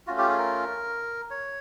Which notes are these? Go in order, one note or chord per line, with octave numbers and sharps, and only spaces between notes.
A3 C#4 F4 F#4
G4
G#4
A#4
C#5